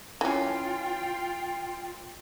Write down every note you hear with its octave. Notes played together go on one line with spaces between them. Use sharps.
E3 C#4 F4 G5